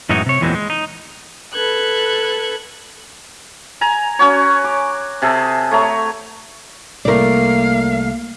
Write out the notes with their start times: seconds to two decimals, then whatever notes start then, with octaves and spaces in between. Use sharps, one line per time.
0.09 F#2 A2 E3 G#3 D#4 F#4
0.26 C3 C#5
0.41 E2 A#2 E3 F#3 G#3 C4
0.55 G#3
0.70 D#4
1.54 A4 B4 F#6 G#6
3.81 G#5 A#5
4.19 C#4 F#4 C#5
4.64 D6
5.22 C3 G#4 A4
5.71 A3 C#5 A#5
7.05 C2 A3 A#3 A#4 D5 F5